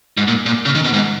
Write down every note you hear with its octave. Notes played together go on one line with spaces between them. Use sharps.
G#2
A#2
A#2
C#3
D#3
B2
G#2